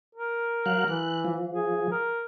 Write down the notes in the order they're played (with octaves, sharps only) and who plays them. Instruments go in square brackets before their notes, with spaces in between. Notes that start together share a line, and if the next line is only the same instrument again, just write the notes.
[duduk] A#4
[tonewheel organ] F#3 F5 F#6
[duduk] E3 [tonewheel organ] F#6
[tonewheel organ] F3
[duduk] G#4
A#4